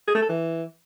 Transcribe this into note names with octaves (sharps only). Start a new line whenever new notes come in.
G#4
A3
A4
E3